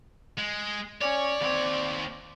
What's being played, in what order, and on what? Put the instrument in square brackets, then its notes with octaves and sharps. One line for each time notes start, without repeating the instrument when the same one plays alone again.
[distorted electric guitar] G#3
[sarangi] C#4 [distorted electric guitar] C#5 [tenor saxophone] D5
[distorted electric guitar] D#2 C#5 [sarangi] C4